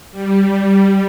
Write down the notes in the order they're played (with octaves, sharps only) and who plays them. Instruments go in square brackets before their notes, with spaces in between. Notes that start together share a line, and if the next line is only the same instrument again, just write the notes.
[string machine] G3